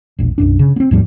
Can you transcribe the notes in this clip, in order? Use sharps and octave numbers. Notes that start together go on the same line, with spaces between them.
E1 A#1
B1 F#2 D4
C#3
B3 C4
D#2 G#2 F3 G3